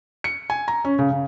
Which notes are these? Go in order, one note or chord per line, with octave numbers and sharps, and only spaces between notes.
C#7
G#5
A#5
C#4
C#3
C#3